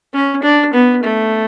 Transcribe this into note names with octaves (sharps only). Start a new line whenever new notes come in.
C#4
D4
B3
A3